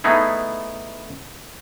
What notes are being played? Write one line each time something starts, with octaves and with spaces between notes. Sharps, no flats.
A3 B3 D#4 E4 G#4